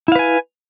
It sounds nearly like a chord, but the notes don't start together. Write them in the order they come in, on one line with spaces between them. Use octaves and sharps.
E4 F5 B4 G#5